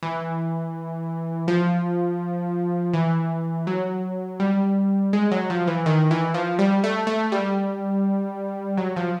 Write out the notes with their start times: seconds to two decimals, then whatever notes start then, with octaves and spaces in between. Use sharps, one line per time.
0.03 E3
1.48 F3
2.94 E3
3.67 F#3
4.40 G3
5.13 G#3
5.31 F#3
5.50 F3
5.67 E3
5.86 D#3
6.11 E3
6.34 F3
6.59 G3
6.84 A3
7.07 A3
7.32 G3
8.77 F#3
8.96 F3